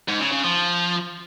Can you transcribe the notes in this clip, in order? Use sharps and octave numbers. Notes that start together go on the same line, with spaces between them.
G#2
C#3
C#3
F3